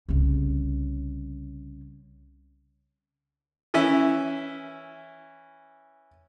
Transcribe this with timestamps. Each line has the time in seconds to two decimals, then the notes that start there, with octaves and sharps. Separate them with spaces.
0.09 C2 C#3
3.74 E3 C#4 E5